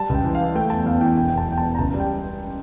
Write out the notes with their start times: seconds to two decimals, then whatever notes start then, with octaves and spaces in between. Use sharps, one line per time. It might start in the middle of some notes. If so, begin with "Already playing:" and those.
Already playing: G3 A5
0.09 C#2 G5
0.24 E3
0.35 F5
0.40 E3
0.55 A3 G5
0.70 E2 A5
0.86 E2 F5
1.01 E3 G5
1.17 E1 G5
1.28 E1 G5
1.38 A5
1.48 E2 G5
1.58 A5
1.63 E3
1.75 A#5
1.78 C#2 A5
1.94 G3
2.00 G5